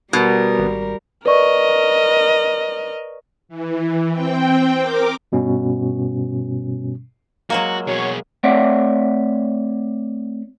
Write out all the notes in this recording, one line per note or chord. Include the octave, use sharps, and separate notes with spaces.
B2 G3 A#4
G#1
A#4 B4 D5 D#5 C#6
E3
C4 G5
A#4 D6
G2 B2 G3 C#4
F#3 G#3 A#3 F#4
B2 F#4 G#4 C#5
A3 C4 C#5 D5 E5 F#5